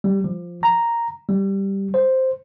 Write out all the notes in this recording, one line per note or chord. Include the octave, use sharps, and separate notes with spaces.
G3
F3
A#5
G3
C5